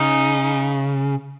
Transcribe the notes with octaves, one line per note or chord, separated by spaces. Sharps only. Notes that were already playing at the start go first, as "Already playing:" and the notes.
Already playing: C#3 D#4